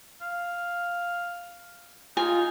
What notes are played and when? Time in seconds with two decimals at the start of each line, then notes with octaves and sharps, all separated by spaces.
0.22 F5
2.17 D#4 F4 G#5